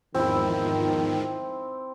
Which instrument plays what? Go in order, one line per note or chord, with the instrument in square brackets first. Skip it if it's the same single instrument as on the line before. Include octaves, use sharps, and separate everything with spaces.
[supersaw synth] E2 G#2 F3 [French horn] D#3 [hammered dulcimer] C4 E4